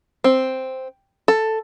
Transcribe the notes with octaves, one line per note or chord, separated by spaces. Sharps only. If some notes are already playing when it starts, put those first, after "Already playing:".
C4
A4